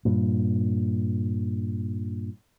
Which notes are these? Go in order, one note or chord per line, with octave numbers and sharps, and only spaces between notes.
G2 A#2